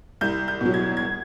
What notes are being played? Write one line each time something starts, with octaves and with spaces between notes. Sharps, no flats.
C2 G6
G6
B2 F#3
G#6
G#6